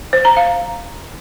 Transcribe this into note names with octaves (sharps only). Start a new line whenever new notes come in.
C5
A#5
F5